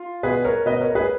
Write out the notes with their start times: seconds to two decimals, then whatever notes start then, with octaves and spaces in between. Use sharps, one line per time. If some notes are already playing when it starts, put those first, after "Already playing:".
Already playing: F4
0.23 B2 G#4 B4
0.45 A#4 C#5
0.66 B2 B4 D#5
0.81 A#4 C#5
0.95 G#4 B4